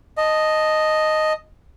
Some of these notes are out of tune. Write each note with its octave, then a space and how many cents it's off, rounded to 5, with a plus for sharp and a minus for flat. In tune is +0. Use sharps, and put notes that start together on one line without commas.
D#5 +0 A5 +0